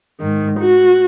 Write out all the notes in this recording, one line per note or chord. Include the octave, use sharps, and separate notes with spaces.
G#2 D#3
F#4